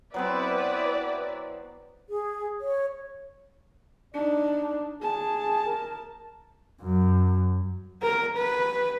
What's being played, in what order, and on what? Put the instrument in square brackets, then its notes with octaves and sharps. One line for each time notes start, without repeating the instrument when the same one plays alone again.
[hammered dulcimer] F#3 B3 C4 [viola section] E4 B4 D5
[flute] G#4
C#5
[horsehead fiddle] D4 D#4 [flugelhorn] D5
[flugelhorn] G#4 [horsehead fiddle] A5
[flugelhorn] A#4
[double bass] F#2
[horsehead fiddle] A#4
B4